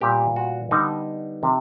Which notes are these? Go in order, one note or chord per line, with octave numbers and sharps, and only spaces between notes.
A#2 G3 B3 G4
F#4
D3 G3 B3 D#4
C3 F3